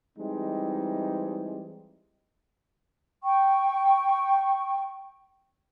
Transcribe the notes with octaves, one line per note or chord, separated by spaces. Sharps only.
E3 G3 G#3 C4 D#4
G5 C#6